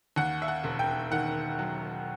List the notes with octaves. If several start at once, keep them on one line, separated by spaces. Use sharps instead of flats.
D#2 F#5
E5
F#5
E1
G5
D#3 F#5
F#3